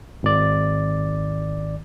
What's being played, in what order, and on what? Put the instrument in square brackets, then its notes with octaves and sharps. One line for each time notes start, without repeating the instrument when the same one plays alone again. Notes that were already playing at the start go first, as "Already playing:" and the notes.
[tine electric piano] G#1 D5